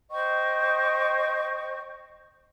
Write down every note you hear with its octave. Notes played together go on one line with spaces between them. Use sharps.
C5 D#5 G5 C#6